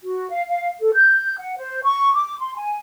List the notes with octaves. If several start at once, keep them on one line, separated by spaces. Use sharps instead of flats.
F#4
F5
F5
A4
G6
F#5
C5
C#6
D6
C6
G#5